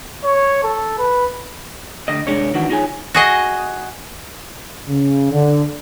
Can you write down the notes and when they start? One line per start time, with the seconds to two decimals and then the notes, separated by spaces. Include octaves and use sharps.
0.24 C#5
0.63 A4
0.99 B4
2.08 D2 D3 D#5
2.27 C2 G#3 D4 C#5
2.54 D#3 E3 D4 F#4
2.70 D#4 F4 G#4 C#5 G#5
3.14 F#4 G#4 D#5
4.87 C#3
5.30 D3